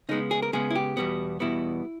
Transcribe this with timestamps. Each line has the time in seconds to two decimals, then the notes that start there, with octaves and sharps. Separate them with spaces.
0.09 C#3 G#3 B3 D#4
0.31 G#4
0.42 A#4
0.53 C#3 G#3 B3 G#4
0.70 E4
0.75 G4
0.97 E2 B2 G3 B3
1.40 E2 B2 G3 B3 E4